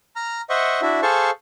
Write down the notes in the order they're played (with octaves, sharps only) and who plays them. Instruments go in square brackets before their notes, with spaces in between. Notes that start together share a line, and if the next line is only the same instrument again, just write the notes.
[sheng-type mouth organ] A#5 F6
C5 D#5 E5 F#5 C#6
D4 E4 F#4 E5
G#4 A4 C5 F5 A5 C#6